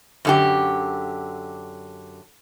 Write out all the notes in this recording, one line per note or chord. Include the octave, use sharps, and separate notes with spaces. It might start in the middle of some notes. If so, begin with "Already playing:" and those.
F#2 D3 G4